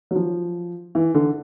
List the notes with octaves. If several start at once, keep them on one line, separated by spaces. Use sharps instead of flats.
F#3
F3
E3
D3